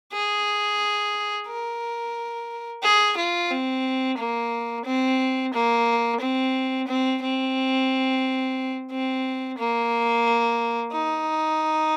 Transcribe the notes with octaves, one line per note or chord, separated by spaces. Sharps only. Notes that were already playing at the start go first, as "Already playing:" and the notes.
G#4
A#4
G#4
F4
C4
A#3
C4
A#3
C4
C4
C4
C4
A#3
D#4